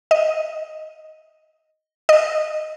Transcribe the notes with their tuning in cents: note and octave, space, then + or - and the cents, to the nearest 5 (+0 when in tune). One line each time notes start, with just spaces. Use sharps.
D#5 +5
D#5 -15